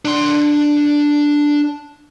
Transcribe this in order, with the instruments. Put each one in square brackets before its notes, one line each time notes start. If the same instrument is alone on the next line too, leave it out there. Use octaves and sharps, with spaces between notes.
[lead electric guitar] D4 C6